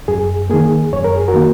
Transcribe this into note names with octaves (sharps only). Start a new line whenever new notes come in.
F#2 G#4
D#3 A#3 G#4
F#2 C#5
A#4
G#4
F#4 A#4
D#3 A#3